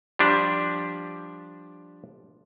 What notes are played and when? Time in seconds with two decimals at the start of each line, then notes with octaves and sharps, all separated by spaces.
0.19 F3 G3 D4 G4